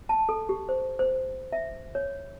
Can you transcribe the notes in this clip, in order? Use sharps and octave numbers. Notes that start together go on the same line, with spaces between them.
A5
A4
G4
C5
C5
E5
C#5